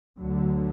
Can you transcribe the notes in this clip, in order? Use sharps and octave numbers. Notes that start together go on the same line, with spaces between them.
D2 D3 F#3